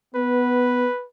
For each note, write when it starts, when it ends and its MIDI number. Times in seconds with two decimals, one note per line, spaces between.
0.15 0.87 59
0.15 1.05 71